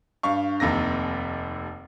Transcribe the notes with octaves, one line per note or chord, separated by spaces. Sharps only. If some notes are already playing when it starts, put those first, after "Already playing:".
G2 F5 C#6
F1 D#2 C3 A#6